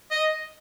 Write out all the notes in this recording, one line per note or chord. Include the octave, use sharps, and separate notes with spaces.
D#5